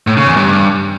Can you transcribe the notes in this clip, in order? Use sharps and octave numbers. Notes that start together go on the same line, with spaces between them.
A2
C#3
E2
G2